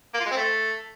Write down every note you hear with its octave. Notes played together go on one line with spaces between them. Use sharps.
A#3
F4
G#3
C4
A3